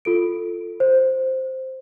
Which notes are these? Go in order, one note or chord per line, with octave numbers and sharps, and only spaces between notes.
F4 A4 D7
C5